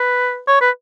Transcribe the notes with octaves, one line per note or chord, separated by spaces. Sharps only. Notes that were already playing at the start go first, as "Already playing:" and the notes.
Already playing: B4
C#5
B4